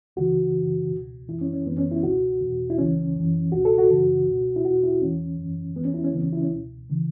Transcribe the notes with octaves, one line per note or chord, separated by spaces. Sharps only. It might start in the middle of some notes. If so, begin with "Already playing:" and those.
C#2 C#3 E3 F#4
F#2 C#3 E3
C#2 B2
F#2 E3 E4
C#4
C#4
F#2 E3 B3
C#4
E4
C#2 B2 F#4
E2 B2
E4
C#2 C#3 E3 C#4
F#2 E3
C#2 B2 F#4
A4
F#4
F#2 C#3 E3
C#2 B2
E4
E2 B2 F#4
E4
E2 E3 C#4
F#2 E3
E2 E3 B3
C#4
E4
C#4
C#2 C#3 E3 B3
C#4
E4
C#4
C#2
B2
C#3 E3